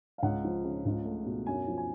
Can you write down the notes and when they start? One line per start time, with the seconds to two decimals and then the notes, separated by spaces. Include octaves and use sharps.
0.18 F5
0.23 C#2 F#5
0.44 F3
0.65 C#3
0.85 C#2
1.05 A3
1.26 B2
1.47 F#2 G#5
1.67 F3
1.78 G#5